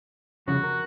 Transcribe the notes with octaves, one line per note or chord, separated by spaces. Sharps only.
C2 F2 C#3 F#4
A#4